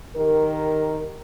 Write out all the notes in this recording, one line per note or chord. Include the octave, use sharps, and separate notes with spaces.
D#3 G4 A#4